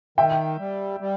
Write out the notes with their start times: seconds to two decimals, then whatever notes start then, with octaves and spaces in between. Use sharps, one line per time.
0.18 D#3 E5 G5
0.59 G3
1.00 G3